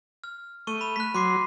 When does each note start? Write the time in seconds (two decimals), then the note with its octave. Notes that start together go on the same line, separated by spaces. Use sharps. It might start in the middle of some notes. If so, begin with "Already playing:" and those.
0.24 F6
0.67 A3 C#6 D#7 G7
0.81 B5 E7
0.96 F#6 B6
1.15 F#3 C6 D6 C7